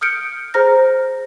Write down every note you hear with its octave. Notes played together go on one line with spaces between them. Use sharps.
D#6 F6 G6 C#7 D7
G#4 C5 A#5 F6 A#6